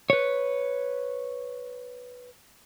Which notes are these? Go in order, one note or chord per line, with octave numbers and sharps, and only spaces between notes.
B4 C#5